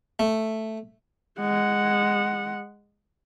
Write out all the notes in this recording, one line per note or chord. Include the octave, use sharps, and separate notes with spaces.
A3
G#3 F#5